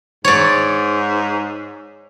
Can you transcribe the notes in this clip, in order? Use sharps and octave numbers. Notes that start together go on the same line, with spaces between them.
G#2 C#5 D5